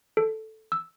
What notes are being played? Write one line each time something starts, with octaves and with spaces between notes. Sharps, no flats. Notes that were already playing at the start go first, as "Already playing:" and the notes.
A4
E6